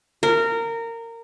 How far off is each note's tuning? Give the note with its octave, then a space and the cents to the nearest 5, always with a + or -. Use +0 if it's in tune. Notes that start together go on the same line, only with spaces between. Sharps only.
A#4 -20